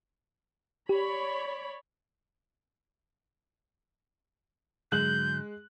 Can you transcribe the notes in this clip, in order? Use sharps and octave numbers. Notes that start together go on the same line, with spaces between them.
G4 C#5 D5 B5
G#2 D3 F#3 G#3 F#6 G6 F#7